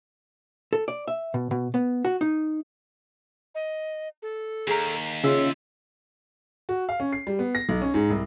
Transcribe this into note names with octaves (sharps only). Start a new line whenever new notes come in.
A4
D5
E5
B2
B2
B3
F#4
D#4
D#5
A4
D#2 G#4 A#4
C#3 F4 E5
F#4
F5
C#4
C7
G3
B3
A#6
B1
C#4
G#2
C2